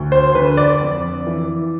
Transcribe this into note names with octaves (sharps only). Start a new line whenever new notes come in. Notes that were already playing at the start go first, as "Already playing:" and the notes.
Already playing: D2
C5
D3 B4
D5
F2
E3